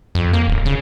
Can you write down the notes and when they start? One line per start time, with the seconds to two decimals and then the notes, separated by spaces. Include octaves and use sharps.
0.15 F2
0.33 A#3
0.47 D1
0.65 C#3